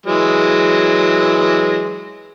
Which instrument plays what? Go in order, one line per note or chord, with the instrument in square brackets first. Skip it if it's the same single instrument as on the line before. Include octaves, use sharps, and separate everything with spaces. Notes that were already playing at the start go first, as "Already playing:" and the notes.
[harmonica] E3 F#3 G#3